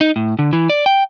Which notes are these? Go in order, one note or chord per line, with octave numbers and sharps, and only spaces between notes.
D#4
A2
D3
E3
D5
G5